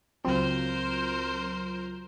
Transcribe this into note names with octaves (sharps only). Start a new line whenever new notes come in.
C#2 F#3 C4 F4 A#4 C5